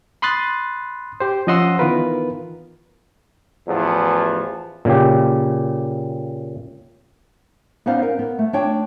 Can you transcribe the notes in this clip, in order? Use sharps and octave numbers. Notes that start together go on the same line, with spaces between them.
B5 C6 D#6 F#6 A6
G4 C5
F3 C#4 D#5 F#5 C6 E6
D#3 E3 B3 F4 A#4 B4
A1 E2 F3
A#2 C#3 G4
B3 C#4 D#4 C5 D5 F5
A#4
B3
A3
D4 C#5 G5